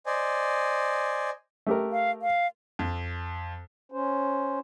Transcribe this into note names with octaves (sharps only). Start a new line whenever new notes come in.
C5 D5 D#5 G#5
A3 G4 A#4
F5
F5
F2
C#4 C5